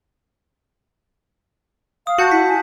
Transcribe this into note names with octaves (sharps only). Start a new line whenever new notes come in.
F5 D#6
F#4 A5 G6 C#7
E4 B6
G#5